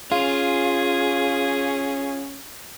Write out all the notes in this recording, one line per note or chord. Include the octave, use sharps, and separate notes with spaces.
C#4 F4 G#4 F5